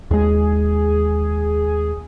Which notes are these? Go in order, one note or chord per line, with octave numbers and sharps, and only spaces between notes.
D#2 G#3 G#4